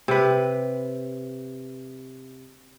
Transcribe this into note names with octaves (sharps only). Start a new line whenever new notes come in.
C3 B4